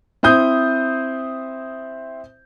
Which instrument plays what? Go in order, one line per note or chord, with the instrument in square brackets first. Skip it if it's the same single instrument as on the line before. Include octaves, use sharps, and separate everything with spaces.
[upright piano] C4 E4 C5 D#6 G6